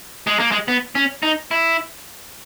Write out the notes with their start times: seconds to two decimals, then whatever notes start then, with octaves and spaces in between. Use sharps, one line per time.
0.27 G#3
0.39 A#3
0.52 G#3
0.68 B3
0.95 C#4
1.23 D#4
1.51 E4